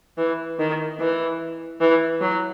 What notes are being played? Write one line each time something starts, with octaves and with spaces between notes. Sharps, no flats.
E3
D#3
E3
E3
F#3